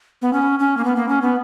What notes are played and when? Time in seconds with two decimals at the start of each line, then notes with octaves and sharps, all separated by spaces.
0.22 B3
0.33 C#4
0.59 C#4
0.77 A#3
0.84 B3
0.96 A#3
1.09 C#4
1.22 B3